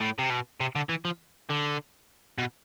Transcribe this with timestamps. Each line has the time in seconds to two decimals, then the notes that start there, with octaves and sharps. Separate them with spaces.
0.01 A2
0.19 C3
0.30 B2
0.60 C3
0.75 D3
0.89 E3
1.05 F3
1.49 D3
2.38 B2